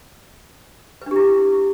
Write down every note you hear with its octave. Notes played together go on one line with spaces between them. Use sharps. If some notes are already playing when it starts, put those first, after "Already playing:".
D4 E4 G4 B4